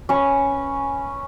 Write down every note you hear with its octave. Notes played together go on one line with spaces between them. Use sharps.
C#4 B4 C#6